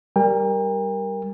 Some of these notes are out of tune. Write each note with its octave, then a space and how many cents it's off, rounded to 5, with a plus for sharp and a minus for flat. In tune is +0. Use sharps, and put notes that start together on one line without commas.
G3 +0 A#4 +0 G5 +40